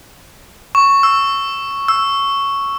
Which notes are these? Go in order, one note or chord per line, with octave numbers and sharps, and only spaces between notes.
C#6
E6
E6